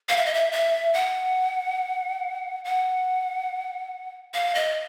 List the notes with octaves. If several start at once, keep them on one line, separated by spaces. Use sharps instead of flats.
F5
E5
D#5
E5
E5
F#5
F#5
F5
D#5